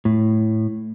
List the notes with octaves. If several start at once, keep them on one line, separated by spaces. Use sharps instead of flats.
A2